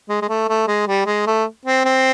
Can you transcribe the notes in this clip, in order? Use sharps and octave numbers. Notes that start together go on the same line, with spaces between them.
G#3
G#3
A3
A3
G#3
G3
G#3
A3
C4
C4